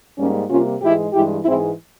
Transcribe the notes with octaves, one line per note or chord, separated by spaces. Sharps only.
G#2 G3 A#3 C#4
C3 G3 A#3 C#4 F4
G#2 E3 G#3 E4 G4
G2 E3 G#3 E4 G4
G#2 E3 G#3 C4 E4